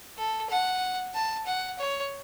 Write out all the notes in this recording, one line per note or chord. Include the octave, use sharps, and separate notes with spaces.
A4
F#5
A5
F#5
C#5